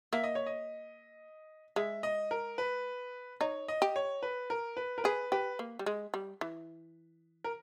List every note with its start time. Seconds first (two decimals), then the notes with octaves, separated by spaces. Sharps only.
0.13 A#3 E5
0.24 D#5
0.35 C#5
0.46 D#5
1.76 G#3 E5
2.03 D#5
2.31 A#4
2.58 B4
3.41 D#4 C#5
3.68 D#5
3.82 G4
3.96 C#5
4.23 B4
4.50 A#4
4.77 B4
4.98 A#4
5.04 G#4 B4
5.32 G4 B4
5.59 A#3
5.79 G3
5.86 G#3
6.14 G3
6.41 E3
7.44 A#4